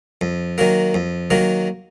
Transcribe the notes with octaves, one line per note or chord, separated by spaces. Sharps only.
F2
D#3 F#3 A#3
F2
D#3 F#3 A#3